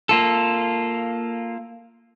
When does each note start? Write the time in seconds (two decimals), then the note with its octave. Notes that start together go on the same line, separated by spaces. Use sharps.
0.09 A#3 F4 A4